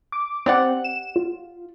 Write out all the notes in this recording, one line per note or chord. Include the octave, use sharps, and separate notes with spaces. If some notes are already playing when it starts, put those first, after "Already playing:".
D6
C4 G4 D5 F#5
E7
F4